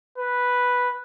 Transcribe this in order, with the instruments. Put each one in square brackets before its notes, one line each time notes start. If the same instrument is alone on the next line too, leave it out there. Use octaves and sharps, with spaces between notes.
[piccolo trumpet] B4